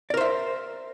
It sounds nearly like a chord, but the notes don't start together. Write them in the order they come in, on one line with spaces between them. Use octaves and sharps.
D5 A#4 C5 E5